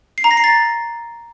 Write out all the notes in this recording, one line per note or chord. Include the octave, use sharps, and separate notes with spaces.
C7
A#5
A#6
C7
A6